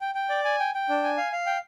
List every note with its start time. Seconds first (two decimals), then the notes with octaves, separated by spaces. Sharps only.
0.01 G5
0.15 G5
0.29 D5
0.45 G#5
0.60 G5
0.74 G5
0.89 D4
1.04 G#5
1.17 F5
1.32 F5
1.46 G5